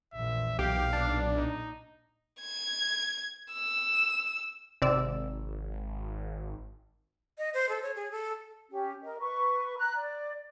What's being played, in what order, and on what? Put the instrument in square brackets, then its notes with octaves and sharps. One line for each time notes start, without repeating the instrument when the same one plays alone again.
[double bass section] A#1 E2 A#2 [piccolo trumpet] E5
[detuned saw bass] B1 [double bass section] A#2 [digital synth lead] G4 [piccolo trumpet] F5
[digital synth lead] D4
[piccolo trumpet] D#4
[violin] G#6
E6
[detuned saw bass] G#1 [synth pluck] C3 D5 E6
[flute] D#5
C5
A4
C#5
G#4
A4
[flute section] C#4 G4
A#4 D#5
B4 C#6
A#5 F#6
D5